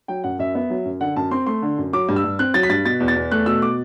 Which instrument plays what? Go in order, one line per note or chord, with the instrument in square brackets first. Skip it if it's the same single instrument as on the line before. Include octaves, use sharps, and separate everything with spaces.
[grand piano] F#3 G5
F#2 F#5
F#2 E5
B3 E5
F#3
F#2
D3 F#5
F#2 A5
C4 C6
A3 C6
D3
F#2
F#3 D6
G2
E6
G2
C4 F#6
F#3 A6
B6
G2 A6
B2 A6
E2
A6
E2
A3 F#6
B2 E6
D6